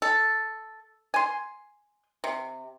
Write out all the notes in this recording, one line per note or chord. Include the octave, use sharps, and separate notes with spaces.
A4
G#5 C6
C3